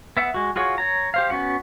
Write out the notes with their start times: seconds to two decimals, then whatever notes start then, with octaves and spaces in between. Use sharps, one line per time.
0.17 B3 E5 F#5
0.34 G#3 F#4
0.56 F4 F#4 G#4 C#5
0.78 C#5 A#5
1.14 G4 C5 F5
1.30 B3 C#4 F#4 F#5